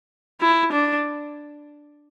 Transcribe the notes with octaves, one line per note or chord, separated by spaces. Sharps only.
E4
D4